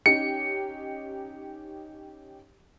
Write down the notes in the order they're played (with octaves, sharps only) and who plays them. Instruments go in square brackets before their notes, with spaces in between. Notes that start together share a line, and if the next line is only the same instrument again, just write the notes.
[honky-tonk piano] C#4 D#4 G4 [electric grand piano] C#7